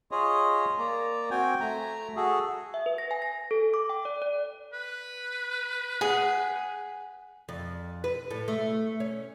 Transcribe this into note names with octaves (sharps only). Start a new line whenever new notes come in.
F4 G#4 C#5 D#5
A#3 D5 A#5
C4 F#4 G5 G#5
A3 A#5
F#4 G#4 A4
E5
B4
A#6
G#5
A#6
A4
D6
G5
D5
D5
B4
G#4 F#5
F2
B4
A2
A3
C#4